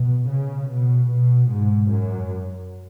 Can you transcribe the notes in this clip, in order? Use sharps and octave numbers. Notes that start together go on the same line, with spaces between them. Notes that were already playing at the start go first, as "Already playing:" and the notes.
Already playing: B2
C#3
B2
B2
G#2
F#2